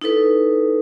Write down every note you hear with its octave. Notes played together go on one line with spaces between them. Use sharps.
D#4 E4 A4 B4